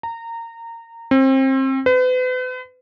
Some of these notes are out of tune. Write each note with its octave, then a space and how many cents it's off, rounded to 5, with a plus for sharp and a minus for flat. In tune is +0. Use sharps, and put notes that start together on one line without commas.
A#5 -20
C4 +30
B4 +40